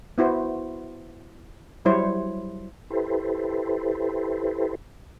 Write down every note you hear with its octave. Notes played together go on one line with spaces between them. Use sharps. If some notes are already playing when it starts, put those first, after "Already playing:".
B3 E4 F#4 C5
F#3 G3 E4 C5 C#5
E4 G4 A4 B4 C5